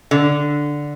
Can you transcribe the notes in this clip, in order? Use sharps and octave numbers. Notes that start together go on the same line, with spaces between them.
D3